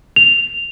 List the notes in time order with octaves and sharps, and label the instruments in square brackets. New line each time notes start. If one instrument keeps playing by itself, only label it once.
[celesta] F7